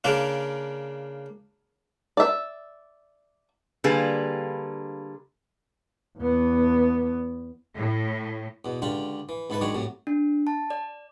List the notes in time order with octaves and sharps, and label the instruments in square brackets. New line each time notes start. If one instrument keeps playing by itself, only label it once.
[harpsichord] C#3 A#3 D4 F4
[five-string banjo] D5 E5
[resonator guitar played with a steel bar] D3 G3 A#3 F4 G#4 B4
[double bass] E2 B3
[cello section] A2
[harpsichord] E2 B2
C#2 D3 D4 F4 G4
E3
C#2 G#2 E4 A4 B4 A5
D#3 F#3 G#3 D4 C#5
C2 A2 C3 F#3
[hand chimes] D4
A5
D5